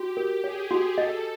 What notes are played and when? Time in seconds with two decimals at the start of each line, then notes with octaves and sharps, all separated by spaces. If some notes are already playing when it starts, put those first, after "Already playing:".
Already playing: F#4 G4
0.17 A#4
0.43 G#4 C#5
0.71 F#4
0.97 A4 D#5